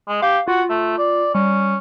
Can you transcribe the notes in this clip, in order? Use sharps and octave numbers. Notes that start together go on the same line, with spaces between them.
G#3
G4 F5
F4 F#4
A3
D5
G3 C#4